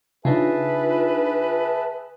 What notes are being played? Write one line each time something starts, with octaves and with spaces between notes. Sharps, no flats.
C#3 D4 D#4 F4 G#4 B4 E5 A5